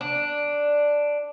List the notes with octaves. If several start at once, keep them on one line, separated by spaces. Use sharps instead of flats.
D4